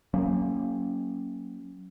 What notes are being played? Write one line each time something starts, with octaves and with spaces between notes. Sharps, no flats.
F#3 A#3 C#4